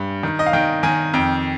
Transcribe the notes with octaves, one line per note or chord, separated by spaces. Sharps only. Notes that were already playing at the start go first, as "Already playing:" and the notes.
Already playing: G2
D#3
D#5
F5
D#3 G5
D#3 G#5
F2 G5